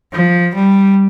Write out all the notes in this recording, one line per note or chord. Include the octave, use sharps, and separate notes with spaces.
F3
G3